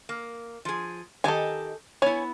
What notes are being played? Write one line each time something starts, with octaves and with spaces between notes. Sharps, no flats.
A#3
F3 G#4
D#3 G4 A4 D#5 G#5
B3 E4 C#5 G#5